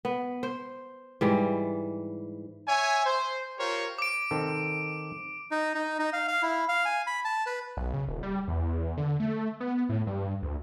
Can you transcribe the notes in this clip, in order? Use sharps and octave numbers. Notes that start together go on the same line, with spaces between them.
B3
C5
G#2 E3 G3
C#5 E5 G#5
C5
F4 G4 A#4 C5 C#5
D6 D7
D#3 C4 A4
D#4
D#4
D#4
F5
F5
E4
F5
G#5
B5
A5
B4
B1
C#3
D#1
G3
E2
D3
A3
B3
A2
G2
D2